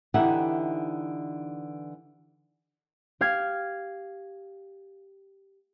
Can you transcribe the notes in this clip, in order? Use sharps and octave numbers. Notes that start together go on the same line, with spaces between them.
D3 E3 D#4 G4 E5 F#5
G4 F5 G#6